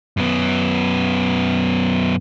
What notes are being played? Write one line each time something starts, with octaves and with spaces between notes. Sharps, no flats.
F#2 B3